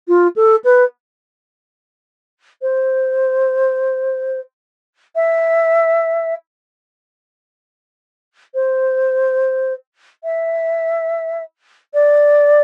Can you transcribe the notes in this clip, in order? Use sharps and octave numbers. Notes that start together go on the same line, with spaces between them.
F4
A4
B4
C5
E5
C5
E5
D5